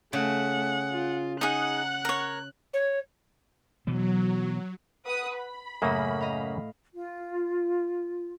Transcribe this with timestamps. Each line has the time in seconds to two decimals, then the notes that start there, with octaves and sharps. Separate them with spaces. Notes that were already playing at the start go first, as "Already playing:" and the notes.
0.13 C#3 A3 F#5
0.92 F4
1.41 D#4 G#4 F#5 F#6
2.05 A#4 C#5
2.73 C#5
3.87 B2 E3 F#3 B3
5.05 B4 F#5 D#6
5.38 B5
5.82 F#2 A2 C#3 A#3 D#6
6.21 D#5 F5
6.93 F4